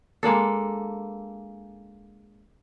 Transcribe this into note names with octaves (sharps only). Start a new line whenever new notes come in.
G#3 A#3 D4 A4